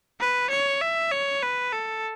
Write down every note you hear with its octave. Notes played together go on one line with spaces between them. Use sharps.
B4
C#5
E5
C#5
B4
A4